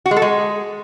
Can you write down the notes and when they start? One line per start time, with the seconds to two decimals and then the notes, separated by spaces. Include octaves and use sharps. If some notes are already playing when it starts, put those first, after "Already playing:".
0.06 F#4
0.11 G#3
0.16 A4
0.22 G#3